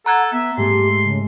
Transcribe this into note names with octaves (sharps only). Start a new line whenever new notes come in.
A4 F#5 A#5 F#6 G#6
B3 E5
G#2 A3 G4 C6
C#3